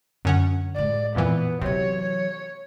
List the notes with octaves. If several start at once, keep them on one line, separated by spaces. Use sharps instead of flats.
F#2 D3 C#4 F#5
A2 G#3 D5
F2 A#2 E3 B3
C3 E3 F#3 C#5
C#5